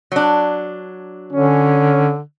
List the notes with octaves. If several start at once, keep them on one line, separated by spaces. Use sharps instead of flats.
F#3 D4
D3 C#4